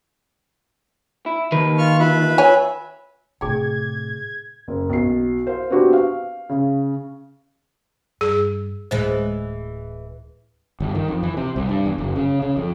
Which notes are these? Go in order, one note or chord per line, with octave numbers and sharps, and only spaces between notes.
E4
D#2 D#3 B4
F4 C#6 F6
F4 B4 E5 B5
C#5 G#5
A2 C3 G#4 G5 G#6
F#1
B1 C7
C5 F5
B3 C4 D4 F#4 G4 B4
F5
C#3
G2 G#4
D1 A2 E3 G#3 C5
G1
D#3
F2
E3
C3
C2
G2
E2
F#1
C#3
C#3
F2